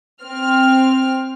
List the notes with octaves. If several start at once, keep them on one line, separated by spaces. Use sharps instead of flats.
C4 F6